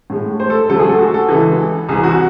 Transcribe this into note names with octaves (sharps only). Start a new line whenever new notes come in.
A2 G#3
C5
A4
C#2 C#3 F#3 A3 A4
G#4
A4
F#4
A4
C#2 C#3 E3
C2 C3 E3 G#4
F#4